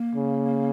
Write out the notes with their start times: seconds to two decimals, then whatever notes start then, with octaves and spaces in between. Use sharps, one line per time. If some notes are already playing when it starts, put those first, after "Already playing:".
Already playing: A#3
0.15 C#3